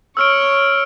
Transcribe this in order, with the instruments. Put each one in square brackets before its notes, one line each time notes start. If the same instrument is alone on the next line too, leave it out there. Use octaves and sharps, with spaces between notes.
[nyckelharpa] C#5 C#6 [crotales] E6 F6 D7